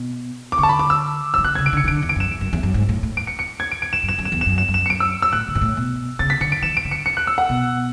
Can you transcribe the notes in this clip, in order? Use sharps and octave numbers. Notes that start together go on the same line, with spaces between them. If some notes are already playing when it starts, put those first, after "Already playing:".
Already playing: B2
D6
D3 C#6
A5
B5
D6
E6
E3 E6
D3 F#6
C#3 G#6
D7
D3 C#7
E3
D3 D7
E2
D7
F#2 E7
E2
F#2
E2
F#2
G#2
A2
A2
D7
C#7
C#7
G#6
D7
D7
E7
F#2
E7
F#2
E7
E2
E7
F#2
E7
F#2
E7
C#7
D7
E6
E6
A2 F#6
D3
G#2
A2
B2
C#3 A6
B6
D3 C#7
D7
E3 E7
D7
D3
C#7
C#7
F#6
E6
F#5
B2